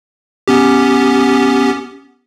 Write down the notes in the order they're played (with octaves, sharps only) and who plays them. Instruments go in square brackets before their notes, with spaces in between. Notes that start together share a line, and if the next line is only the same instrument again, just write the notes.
[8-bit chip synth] B3 C#4 G4